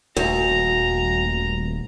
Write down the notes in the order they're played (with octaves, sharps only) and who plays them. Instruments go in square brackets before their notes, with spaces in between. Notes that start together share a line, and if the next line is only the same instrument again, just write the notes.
[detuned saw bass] D#1 [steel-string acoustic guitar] D2 [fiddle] A#5